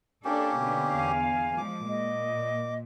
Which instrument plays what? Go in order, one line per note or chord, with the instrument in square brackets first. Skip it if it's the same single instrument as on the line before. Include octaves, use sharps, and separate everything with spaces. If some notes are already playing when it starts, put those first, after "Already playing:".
[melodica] A#3 C#4 G4 [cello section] D4 A4
[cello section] B2 D3 B3
[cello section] E2 F5 [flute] G#5
[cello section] F3 G#3 [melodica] D6
[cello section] A#2 [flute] D#5